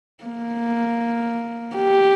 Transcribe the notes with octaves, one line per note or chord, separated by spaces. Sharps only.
A#3
G4